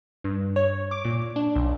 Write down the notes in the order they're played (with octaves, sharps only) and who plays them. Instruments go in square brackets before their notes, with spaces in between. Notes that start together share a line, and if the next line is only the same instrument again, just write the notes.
[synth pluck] G2
C#5
D6
A#2
D4
B1